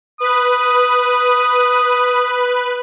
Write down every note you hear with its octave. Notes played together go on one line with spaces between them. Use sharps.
B4 D#6